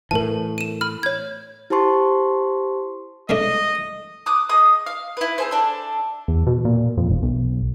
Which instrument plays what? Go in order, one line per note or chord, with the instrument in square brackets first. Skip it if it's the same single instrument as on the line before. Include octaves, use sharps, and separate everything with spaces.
[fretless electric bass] A2 E3 [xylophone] A#4 A5
[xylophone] D#7 E7
B5 F6
C#5 G#6
[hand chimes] E4 G4 C5 A5 C6 C#6
[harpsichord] G#3 A3 D4 [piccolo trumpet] D#5
[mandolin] D6 D#6 F#6
G#4 D#5 D#6
F5
E4 B4
C4 G#4 C5
D4 A4
[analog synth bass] E2
B2
A#2
F2
E1
B1